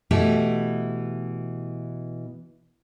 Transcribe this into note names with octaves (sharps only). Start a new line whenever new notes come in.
B2 E3 A3 E4 G4